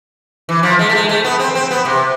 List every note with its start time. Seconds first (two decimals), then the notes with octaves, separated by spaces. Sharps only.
0.49 E3
0.63 F3
0.79 G#3
0.89 A3
0.95 G#3
1.09 A3
1.25 B3
1.39 C4
1.55 C4
1.71 B3
1.85 C3